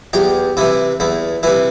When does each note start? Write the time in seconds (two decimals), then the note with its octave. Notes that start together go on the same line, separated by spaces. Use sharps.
0.13 E2 G4
0.57 C3 E3 E4
1.00 E2 E4
1.43 C3 E3 E4